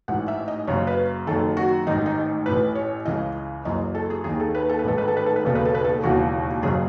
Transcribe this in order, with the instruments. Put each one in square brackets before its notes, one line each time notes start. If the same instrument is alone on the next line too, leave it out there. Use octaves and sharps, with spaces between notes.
[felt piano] A1 G#2 E3 F#5
E5
D#5
F#1 F#2 C#3 C#5
B4
F#1 F#2 D#3 A4
F#4
A1 G#2 D#3 D#4
D#4
A1 A2 E3 B4
C#5
C#2 C#3 E3 D#5
F#1 F#2 E3 D#5
A4
G#4
D#2 D#3 G#4
A4
B4
A4
B4
A1 G#2 D#3 A4
B4
A4
B4
A4
B4
E1 D#2 C#3 A4
B4
A4
B4
A4
E1 D#2 C#3 E3 F#4
F#1 F#2 C#3 G#4